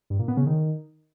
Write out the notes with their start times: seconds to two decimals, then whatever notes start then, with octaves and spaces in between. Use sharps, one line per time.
0.10 G2
0.19 A#2
0.28 B3
0.37 C#3
0.46 D#3